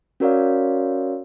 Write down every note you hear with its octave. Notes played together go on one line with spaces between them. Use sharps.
C#4 F#4 A#4 C#5 D5 F5